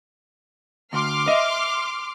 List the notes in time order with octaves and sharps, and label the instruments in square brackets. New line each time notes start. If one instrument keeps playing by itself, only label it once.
[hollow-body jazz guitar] D2 [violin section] C6 D6 F6
[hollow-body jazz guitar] D#5 E5